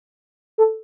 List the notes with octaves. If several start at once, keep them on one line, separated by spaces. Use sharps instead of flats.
A4